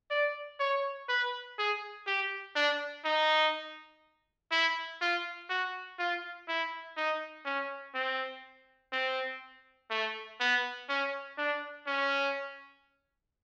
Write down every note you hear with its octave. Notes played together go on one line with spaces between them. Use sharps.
D5
C#5
B4
G#4
G4
D4
D#4
E4
F4
F#4
F4
E4
D#4
C#4
C4
C4
A3
B3
C#4
D4
C#4